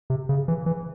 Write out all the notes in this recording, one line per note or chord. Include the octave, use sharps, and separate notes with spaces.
C3
C#3
E3
E3